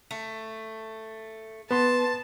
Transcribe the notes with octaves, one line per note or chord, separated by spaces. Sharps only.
A3
B3 B4 A5 C6